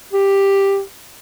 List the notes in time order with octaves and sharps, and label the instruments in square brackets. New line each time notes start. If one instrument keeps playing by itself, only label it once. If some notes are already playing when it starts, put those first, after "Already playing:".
[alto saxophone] G4